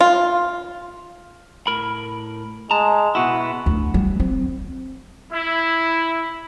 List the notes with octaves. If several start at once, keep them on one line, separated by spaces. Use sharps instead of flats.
F4
A2 A#4 B5
G#3 A5 A#5
B2 B3 E4 F#4
D2
G3
C4
E4